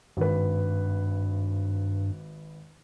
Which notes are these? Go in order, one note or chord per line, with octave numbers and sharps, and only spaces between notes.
G#1 G2 B4